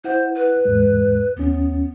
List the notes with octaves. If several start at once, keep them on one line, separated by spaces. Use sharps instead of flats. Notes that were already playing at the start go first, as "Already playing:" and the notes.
E4 C5 F#5
B4
E2 G#2 G#3
D#2 B3 C#4